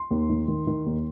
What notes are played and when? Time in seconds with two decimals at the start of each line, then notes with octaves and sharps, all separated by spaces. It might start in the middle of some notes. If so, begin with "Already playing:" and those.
Already playing: C6
0.11 D#2
0.29 D#3
0.48 D#3
0.67 D#3
0.86 D#2